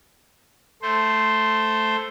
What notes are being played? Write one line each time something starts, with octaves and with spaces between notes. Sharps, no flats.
A3 C5